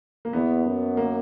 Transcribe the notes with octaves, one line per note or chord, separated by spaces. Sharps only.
A#3
E2 B3
F#2
A#3